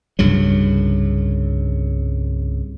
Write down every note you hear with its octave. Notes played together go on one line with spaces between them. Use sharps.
C2 G2 C#3 F#3